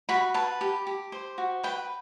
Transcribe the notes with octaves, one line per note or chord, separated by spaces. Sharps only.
F#4 B5
B4 A5
G4
G4
C5
F#4
B4 G5